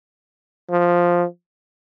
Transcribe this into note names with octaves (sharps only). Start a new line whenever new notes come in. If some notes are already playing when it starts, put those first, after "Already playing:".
F3